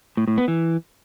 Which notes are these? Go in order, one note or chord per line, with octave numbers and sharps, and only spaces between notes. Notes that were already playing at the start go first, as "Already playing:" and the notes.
A2
A2
B3
E3